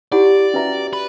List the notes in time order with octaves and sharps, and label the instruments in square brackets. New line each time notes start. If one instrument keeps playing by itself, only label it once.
[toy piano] E4 G4 C#5 F#5 B5 [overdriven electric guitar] D5
[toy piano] C#4 F#4 B4 E5 A#5
[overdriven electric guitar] B4